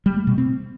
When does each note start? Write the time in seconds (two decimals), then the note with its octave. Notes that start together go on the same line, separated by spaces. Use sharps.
0.06 G3
0.16 A3
0.27 B2
0.38 C4